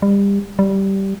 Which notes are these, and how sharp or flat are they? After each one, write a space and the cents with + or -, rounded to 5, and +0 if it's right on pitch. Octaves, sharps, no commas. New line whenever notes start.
G3 +30
G3 -10